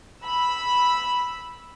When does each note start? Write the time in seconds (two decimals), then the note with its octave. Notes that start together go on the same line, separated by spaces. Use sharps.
0.24 B5 E6